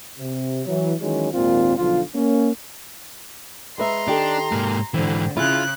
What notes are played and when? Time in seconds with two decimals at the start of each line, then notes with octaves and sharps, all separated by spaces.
0.19 C3
0.65 E3 F#3
1.00 D#3 E3 F#3 G#3 C#4
1.32 G#1 D#2 A#2 C4 F4
1.77 B1 D3 F3 F4
2.14 A#3 C#4
3.78 G#3 B4 E5 A#5 C6
4.08 D#3 D4 G4 A4
4.52 G#2 A#3
4.94 G#2 D3 E3 C4
5.37 C#3 E4 F4 G#4 F#6